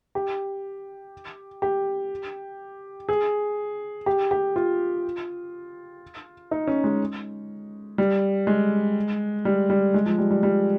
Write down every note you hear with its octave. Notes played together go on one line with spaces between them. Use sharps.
G4
G4
G#4
G4
G4
F4
D#4
C#4
G#3
G3
G#3
G3
G3
G#3
F3
G3
G3
G3